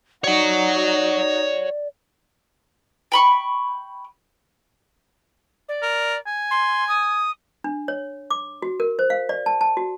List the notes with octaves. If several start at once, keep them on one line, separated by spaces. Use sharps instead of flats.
D#4 F#4 C#5 D5 F#5
G5 B5 C#6
D5
A#4
G#5
C6
D#6
D4
C#5
D6
F#4
A#4
C5
F5
D5
A5
A5
F#4